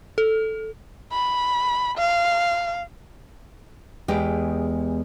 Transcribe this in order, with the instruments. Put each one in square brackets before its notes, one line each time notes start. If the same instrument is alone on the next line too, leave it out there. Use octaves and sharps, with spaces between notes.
[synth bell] A4
[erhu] B5
F5
[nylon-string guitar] E2 G#3 G4 G5